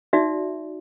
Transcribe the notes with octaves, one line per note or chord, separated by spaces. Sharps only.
D#4 F#4 D5 E5